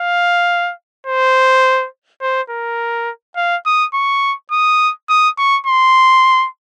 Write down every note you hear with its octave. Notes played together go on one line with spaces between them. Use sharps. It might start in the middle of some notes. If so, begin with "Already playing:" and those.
Already playing: F5
C5
C5
A#4
F5
D#6
C#6
D#6
D#6
C#6
C6